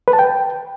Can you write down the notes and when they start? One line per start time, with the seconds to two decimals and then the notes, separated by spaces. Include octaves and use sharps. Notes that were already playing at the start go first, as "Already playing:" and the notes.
0.08 B4
0.13 A5
0.19 G5